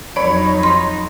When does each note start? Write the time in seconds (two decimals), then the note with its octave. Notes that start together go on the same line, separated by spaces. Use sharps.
0.16 F2 F#3 D#4 C#5 D5 B5
0.63 C6